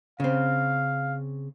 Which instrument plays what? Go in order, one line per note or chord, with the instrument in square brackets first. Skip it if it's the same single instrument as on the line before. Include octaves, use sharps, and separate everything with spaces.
[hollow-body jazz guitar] C#3 C4 [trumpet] F5